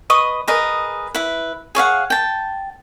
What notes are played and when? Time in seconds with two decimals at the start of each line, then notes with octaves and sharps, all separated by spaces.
0.10 B4 D#5 C#6 D#6
0.48 G#4 A#4 B4 D#5
1.15 E4 B4
1.75 G#4 C#5 F5 F#5
2.10 G5 A5